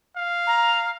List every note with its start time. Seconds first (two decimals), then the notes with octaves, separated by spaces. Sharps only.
0.16 F5
0.47 A#5